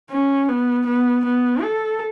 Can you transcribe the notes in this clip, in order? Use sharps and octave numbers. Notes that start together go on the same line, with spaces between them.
C#4
B3
B3
B3
A4